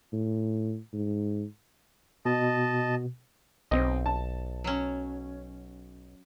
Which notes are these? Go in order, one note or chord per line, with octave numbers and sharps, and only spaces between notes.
A2
G#2
B2 D#5 A5
B1 C4 D#5
A5
F#3 C#4